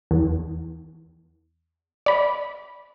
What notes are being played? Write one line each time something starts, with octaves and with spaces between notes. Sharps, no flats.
E2
D5 B5